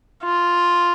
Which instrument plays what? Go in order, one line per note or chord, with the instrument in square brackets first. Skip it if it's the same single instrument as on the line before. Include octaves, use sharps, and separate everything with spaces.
[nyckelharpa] F4